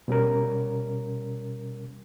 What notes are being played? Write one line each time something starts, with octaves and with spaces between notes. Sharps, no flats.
B2 G3 C#4 A#4